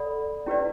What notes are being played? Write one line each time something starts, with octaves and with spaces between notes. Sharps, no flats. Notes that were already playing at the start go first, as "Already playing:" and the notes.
Already playing: A4 D5 F#5 B5
C#4 E4 G4 B4 D5